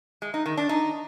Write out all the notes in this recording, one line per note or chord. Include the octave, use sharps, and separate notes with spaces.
G#3
D#4
D#3
D4
D#4